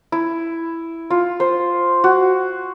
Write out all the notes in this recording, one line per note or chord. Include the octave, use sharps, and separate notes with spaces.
E4
F4
C5
F#4